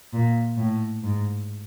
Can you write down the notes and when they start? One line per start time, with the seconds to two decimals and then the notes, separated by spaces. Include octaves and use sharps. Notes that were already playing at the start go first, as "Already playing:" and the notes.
0.13 A#2
0.57 A2
1.03 G#2